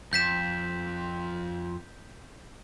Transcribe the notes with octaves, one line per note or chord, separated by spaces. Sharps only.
F2 G6 B6 E7